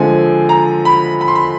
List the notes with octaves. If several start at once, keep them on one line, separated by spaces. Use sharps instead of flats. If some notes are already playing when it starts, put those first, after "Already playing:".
Already playing: D3 F3 G#3 C4 G#5
A#5
B5
B5
C6
B5